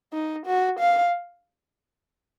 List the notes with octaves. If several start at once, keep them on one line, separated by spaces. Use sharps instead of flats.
D#4
F#4
F5